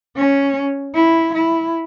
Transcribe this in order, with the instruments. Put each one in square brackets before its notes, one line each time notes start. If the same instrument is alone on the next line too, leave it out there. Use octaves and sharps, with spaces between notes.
[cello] C#4
E4
E4